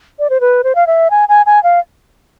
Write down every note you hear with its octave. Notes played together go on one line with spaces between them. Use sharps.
D5
C5
B4
C5
F5
E5
G#5
G#5
G#5
F5